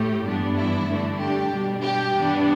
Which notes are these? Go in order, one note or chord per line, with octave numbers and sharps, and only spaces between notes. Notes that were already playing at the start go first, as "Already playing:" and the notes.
Already playing: A2 A3 G4
G2 E3 B3 D4
E4
G2 D3 A3 D4
G4
B2 G3 D4
G4
G2 E3 B3 D4